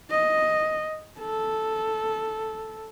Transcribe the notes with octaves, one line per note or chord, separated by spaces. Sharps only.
D#5
A4